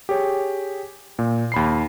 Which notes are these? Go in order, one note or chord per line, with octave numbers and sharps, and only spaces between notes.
G4 G#4 C#5
A#2
D#2 B5 C7